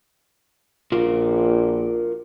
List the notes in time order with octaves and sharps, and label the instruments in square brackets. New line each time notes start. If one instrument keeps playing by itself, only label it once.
[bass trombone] A#1 [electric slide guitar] F4 F#4 A#4